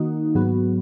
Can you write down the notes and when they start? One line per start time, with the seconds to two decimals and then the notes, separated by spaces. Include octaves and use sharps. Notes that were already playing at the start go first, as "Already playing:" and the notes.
Already playing: D#3 A#3 D#4 F#4
0.35 G#2 F#3 B3 F#4